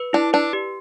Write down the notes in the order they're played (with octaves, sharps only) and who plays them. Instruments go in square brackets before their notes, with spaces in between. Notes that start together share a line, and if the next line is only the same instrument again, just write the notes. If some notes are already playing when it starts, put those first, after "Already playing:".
Already playing: [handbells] B4
[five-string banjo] D4 [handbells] E4
[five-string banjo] D4 [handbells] B4
[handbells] G4